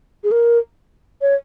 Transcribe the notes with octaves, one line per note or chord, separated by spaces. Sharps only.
G#4
A#4
C#5